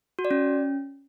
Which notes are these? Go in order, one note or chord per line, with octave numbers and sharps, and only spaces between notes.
F#4
D5
C#4